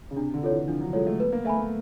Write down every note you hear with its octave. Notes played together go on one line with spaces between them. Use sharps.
C#3
C3 D4
D3
F4 A4 C#5
E3
F3 D4
F#3
G#3 F4 A4 C#5
A3
B3 B4
A#3
A3 E5 G#5 B5
A#3